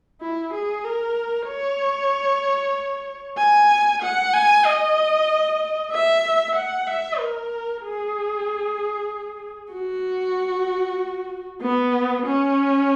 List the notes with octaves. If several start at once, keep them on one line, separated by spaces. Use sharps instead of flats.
E4
G#4
A#4
C#5
G#5
F#5
G#5
D#5
E5
F#5
E5
A#4
G#4
F#4
B3
C#4